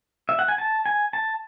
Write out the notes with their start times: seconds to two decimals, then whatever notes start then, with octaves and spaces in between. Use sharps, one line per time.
0.29 E5
0.39 F#5
0.48 G#5
0.58 A5
0.86 G#5
1.13 A5